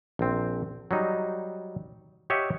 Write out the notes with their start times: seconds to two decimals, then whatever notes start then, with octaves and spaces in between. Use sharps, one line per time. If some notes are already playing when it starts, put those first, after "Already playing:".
0.19 A#1 C4
0.91 F#3 G3 D#4
2.30 G4 C#5 D#5 E5 F#5